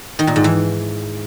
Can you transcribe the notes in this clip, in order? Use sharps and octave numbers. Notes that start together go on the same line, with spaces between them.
D#3
A#2
G#2
E3